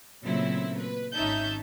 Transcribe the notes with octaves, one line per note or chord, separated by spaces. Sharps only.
A#2 C#3 F#3 A3 C4 E4
B4
G#1 C#4 D#4 E5 A5 G6